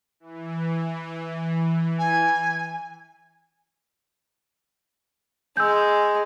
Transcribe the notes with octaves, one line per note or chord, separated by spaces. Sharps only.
E3
G#5
G#3 E6 G6